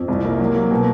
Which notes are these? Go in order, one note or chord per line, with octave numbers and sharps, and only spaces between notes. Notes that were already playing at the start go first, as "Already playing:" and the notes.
Already playing: F2
C2
A#3
F#3
A#3
B2